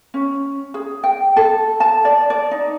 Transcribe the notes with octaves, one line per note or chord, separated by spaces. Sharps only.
C#4
G#4
G5
A4
A5
D5
D5
D#4